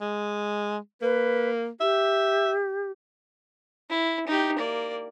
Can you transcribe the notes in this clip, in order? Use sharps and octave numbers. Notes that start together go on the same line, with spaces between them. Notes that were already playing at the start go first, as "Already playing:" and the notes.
G#3
A#3 B4
G4 E5
E4
D#4 G4
A#3 D5